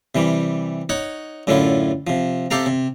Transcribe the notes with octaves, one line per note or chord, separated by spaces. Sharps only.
C3 E3 G3
D#4 C#5 F#5
F#2 A2 D3 E4 F4
C3 F3
C3 G4 A4 F5 A#5
C3